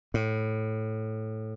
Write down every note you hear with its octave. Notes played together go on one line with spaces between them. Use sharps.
A2